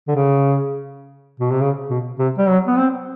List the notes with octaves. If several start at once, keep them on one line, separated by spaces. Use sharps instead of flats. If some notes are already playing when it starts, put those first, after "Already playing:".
D3
C#3
B2
C3
C#3
B2
C3
G3
F#3
B3
C4